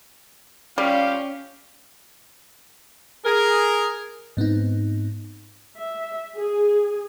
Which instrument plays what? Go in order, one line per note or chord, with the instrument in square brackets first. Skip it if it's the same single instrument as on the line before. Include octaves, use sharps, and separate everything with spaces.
[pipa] G3 [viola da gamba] C#4 [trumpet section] F4 G4 F5
[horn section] G#4 A#4
[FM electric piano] G#2 B3 C4 D#4
[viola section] E5
G#4